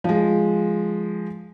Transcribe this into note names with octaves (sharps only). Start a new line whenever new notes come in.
F3 G#3